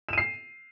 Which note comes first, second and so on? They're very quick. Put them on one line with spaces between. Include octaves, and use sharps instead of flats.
E7 D#7 C7